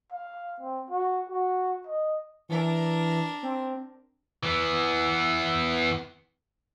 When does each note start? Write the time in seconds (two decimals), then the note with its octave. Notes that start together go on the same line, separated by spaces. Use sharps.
0.12 F5
0.60 C4
0.90 F#4
1.30 F#4
1.87 D#5
2.49 E3 D4 A#4
3.43 C4
4.43 E3 B3